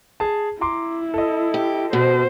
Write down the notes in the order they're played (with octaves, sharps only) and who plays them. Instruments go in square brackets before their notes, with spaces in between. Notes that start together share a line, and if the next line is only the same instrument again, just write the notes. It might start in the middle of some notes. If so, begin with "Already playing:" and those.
[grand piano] G#4 A5
[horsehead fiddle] E4 [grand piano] A#5 C6 D6
[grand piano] A4 D#5
[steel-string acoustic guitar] G4
[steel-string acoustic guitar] B2 [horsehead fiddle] C5